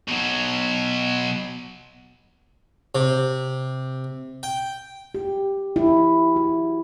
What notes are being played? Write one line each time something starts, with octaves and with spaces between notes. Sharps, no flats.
B2 F#3
C3
G5
G4
E4
F#4